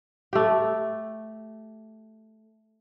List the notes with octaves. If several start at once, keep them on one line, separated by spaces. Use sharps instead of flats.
A3 G4